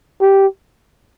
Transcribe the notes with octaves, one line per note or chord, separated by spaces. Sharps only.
G4